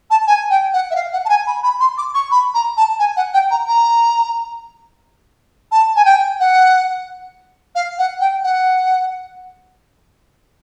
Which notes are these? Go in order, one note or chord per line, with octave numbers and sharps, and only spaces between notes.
A5
G#5
G5
F#5
E5
F5
F#5
A5
G#5
B5
B5
C6
D6
C#6
B5
A#5
A5
G#5
F#5
G5
A#5
A#5
A5
G#5
G5
F#5
F5
F#5
G5
F#5